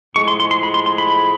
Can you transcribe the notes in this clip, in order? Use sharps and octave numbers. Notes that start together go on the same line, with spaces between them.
A2 F3 G#3 C#6
C6
C6
C6
B5
C6
C6
B5